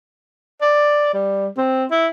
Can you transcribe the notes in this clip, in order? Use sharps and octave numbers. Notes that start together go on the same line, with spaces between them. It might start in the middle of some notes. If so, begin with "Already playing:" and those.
D5
G3
C4
E4